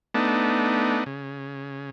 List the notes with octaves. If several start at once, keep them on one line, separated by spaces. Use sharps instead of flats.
A3 B3 D4 D#4
C#3